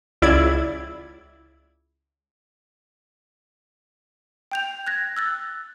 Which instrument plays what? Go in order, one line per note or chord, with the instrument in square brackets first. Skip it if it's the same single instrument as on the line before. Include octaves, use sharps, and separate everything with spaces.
[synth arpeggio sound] C#2 E4 D5 G#6
[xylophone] G5 G6 F7
F#6 G#6 A#6
E6 F#6 A6